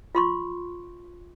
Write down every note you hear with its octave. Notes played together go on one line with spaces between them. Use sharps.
F4 C6 C#6